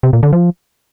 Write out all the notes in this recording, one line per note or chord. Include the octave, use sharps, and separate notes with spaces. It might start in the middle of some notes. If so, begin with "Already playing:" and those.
C3
A#2
D3
F3